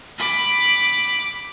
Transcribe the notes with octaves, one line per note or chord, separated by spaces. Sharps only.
B5 D6